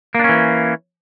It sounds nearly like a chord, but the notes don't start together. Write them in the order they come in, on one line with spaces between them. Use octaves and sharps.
A#3 D4 C#4 E3